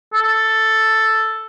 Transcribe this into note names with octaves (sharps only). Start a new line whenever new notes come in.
A4